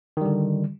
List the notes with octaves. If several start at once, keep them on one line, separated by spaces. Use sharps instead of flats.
D3 D#3 G3